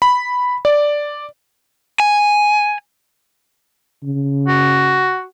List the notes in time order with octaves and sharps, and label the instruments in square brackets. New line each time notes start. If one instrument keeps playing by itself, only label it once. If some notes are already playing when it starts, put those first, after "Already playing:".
[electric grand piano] B5
D5
[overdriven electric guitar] G#5
[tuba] C#3
[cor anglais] F#4